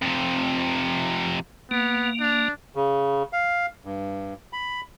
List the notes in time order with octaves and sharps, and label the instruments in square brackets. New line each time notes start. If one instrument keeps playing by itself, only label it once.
[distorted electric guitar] F2 C3
[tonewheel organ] A#3 [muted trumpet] B3
[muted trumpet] D4
[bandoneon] C#3
F5
G2
B5